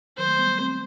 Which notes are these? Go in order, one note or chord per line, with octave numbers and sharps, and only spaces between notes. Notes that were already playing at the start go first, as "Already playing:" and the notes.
D#3 F#3 C5
A3
G3 B3
A3 C4